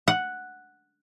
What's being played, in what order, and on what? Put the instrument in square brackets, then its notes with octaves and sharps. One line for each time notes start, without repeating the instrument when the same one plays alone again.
[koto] F#5